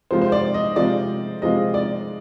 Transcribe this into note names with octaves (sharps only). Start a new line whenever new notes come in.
C3 F3 G#3 C4 F4 C5
C5
D5
D#5
C3 F3 G#3 C4 F4 D5
C3 F3 G#3 C4 F4 D#5
D5